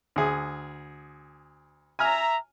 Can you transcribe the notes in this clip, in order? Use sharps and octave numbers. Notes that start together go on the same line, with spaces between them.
D2 G#4
E5 G#5 A#5 F6